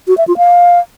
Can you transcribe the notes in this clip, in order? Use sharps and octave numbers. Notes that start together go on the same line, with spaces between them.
F#4
E5
F4
F5